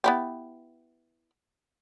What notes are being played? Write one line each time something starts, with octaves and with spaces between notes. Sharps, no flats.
B3 E4 G4